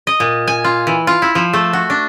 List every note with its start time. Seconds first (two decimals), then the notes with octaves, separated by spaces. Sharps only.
0.07 D#5
0.20 A#2
0.48 G#5
0.64 F4
0.87 E3
1.07 F4
1.22 E4
1.35 F3
1.53 A3
1.73 F#4
1.90 D4